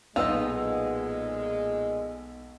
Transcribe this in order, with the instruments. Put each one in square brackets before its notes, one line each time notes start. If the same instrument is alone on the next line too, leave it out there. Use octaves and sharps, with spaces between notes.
[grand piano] B1 E6 [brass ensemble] A#2 G#3 [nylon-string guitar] B3 D#4 [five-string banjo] F4 D#5